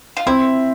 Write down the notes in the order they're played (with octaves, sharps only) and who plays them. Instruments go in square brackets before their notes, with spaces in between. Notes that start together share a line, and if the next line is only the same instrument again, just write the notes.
[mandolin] F4
[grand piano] C4 [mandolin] E4